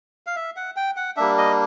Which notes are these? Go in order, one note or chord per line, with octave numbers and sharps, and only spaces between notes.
F5
E5
F#5
G5
F#5
G3 A#3 D4 E5
D#5